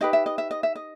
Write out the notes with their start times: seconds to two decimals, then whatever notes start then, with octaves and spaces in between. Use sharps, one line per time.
0.01 D#4 G4 B4 D#5
0.13 E5
0.26 D#5
0.38 E5
0.51 D#5
0.63 E5
0.75 D#5